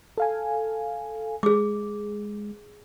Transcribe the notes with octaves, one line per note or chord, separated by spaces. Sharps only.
A4 F5 G#5
G#3 G#4 D6